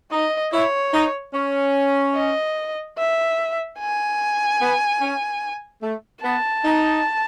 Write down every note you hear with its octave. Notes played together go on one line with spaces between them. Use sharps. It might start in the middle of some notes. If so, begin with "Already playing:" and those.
D#4 D#5
E4 C#5
D#4
C#4
D#5
E5
G#5
B3
C#4
A3
B3 A5
D#4